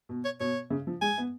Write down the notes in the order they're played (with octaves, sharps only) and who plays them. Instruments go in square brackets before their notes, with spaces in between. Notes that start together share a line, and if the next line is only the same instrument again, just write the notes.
[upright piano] B2
[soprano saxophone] C#5
[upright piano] B2 [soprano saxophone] C#5
[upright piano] C#3
F3
[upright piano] G#3 [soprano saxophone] G#5
[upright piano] B3